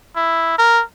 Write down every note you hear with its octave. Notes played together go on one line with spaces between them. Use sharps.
E4
A#4